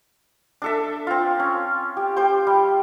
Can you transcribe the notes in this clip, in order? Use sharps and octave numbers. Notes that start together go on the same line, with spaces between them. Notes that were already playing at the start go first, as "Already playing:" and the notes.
D4 A4 E5
C4 F4
C#4
G4
G4 C5 G5
G3